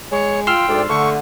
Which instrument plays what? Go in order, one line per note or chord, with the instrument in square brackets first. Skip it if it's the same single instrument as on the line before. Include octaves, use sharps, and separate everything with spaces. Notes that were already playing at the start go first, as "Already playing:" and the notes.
[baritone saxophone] G#3 [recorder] C#5
[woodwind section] F4 F5 [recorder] G5 [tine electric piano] C6 E6 F6
[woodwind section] D2 D5 [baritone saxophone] G#2
[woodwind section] D3 [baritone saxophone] A3 [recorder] C#6